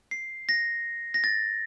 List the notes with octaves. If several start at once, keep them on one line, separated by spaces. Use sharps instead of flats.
C7
A#6
A#6
A6